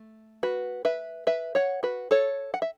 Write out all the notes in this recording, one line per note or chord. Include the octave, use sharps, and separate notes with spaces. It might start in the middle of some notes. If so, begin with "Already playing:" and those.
Already playing: A3
F#4 B4
B4 E5
B4 E5
C#5 F#5
F#4 B4
A4 C#5
F#5
E5